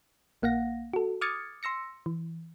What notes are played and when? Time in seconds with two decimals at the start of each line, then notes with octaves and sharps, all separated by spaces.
0.42 A#1 A#3 F5 F#5 A#6
0.94 F#4 A4
1.21 D6 D#6 F6 G#6 A6 C#7
1.63 C6 E6 A#6 C#7
2.06 E3